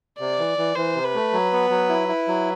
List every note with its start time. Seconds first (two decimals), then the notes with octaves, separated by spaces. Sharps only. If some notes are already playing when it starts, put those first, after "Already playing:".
0.20 C3 D5
0.39 E3
0.58 E3
0.76 E3 C5
0.95 C3
1.04 B4
1.15 A3
1.33 F#3
1.53 B3
1.70 F#3
1.89 E4
2.08 E4
2.28 F#3